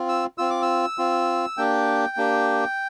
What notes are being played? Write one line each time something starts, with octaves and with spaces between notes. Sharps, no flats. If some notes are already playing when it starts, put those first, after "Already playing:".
Already playing: C4 F4
E6
C4 F4 E6
D6
E6
C4 F4
A#3 D4 G4 G5
A#3 D4 G4